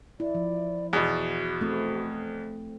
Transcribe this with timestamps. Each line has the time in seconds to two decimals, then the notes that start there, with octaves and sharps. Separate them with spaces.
0.20 E4 D5
0.35 F3
0.93 E2 B2 F#4
1.61 A3 C4